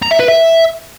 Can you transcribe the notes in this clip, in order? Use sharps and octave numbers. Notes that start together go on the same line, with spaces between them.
A#5
E5
B4
E5